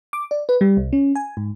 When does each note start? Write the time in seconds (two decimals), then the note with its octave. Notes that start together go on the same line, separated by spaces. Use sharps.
0.13 D6
0.31 D5
0.49 B4
0.61 G3
0.77 C2
0.93 C#4
1.15 G#5
1.37 G#2